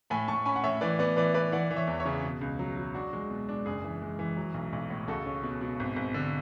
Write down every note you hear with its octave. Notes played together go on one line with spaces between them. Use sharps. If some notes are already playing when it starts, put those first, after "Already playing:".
A2 G#5 B5
A2 A5 C#6
C#4 G#5 B5
F#5
A2 C#5 E5
E3 B4 D5
B3 B4 D5
E3 B4 D5
B3 B4 D5
E3 D5 F#5
E3
C#5 E5
E2
C#5 E5
C#3
B2
C#2
F#3
F#3
D4 F#4
G#3
B2
D4
F#1 G#4
E3
G#3
E3
F#3
B1
B1
A2
C#2 F#4 A4
C#4
B2
B2
G#1
G#1
D3